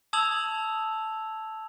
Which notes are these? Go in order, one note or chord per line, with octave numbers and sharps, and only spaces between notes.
A5 D#6 E6 G#6 F7 F#7